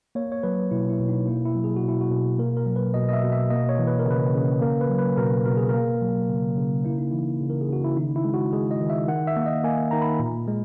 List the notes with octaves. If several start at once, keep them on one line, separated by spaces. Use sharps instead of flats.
A#3 C#5
C#5
F#3 B4
B2 E4
E4
B2
D#4
A#3 E4
E4
F#3
G#4
F#4
B2 E4
F#4
B2
A#3 A#4
A#4
F#3
B4
B2 D#5
D#5
E5
B2
E5
A#3 D#5
C#5
E3
B4
A#4
C#3 B4
C#3
A#3 A#4
B4
F#3
B4
B2 A#4
B2 A#4
G#4
A#3 A#4
F#3
C#3
C#3
A#3 E4
D#4
E3 E4
C#3
A#4
G#4
C#3 F#4
E4
D#3 D#4
E4
G#3
F#4
G#3 G#4
D#5
D#3
E5
D#3 F#5
E5
A#3
D#5
A#3 G#5
D#3 A#5
B5
A#2
G#3